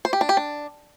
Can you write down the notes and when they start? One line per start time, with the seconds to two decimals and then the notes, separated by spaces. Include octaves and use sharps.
0.05 C5
0.13 G4
0.21 D4
0.29 G4
0.37 D4